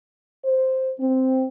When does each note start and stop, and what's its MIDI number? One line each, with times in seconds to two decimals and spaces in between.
0.45 0.91 72
1.00 1.46 60